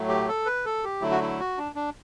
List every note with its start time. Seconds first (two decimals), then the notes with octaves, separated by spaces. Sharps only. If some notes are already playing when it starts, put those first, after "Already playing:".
Already playing: A2 F#3 A3
0.09 G4
0.28 A4
0.46 B4
0.65 A4
0.84 G4
1.01 D3 F#3 A3 E4
1.11 F#4
1.21 E4
1.40 F#4
1.58 D4
1.75 D4